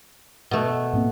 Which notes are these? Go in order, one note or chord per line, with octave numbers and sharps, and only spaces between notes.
B2 A3
G#2 A#3 C4